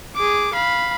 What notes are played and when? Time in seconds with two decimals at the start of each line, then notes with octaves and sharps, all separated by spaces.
0.16 G#4 D6
0.55 F5 B5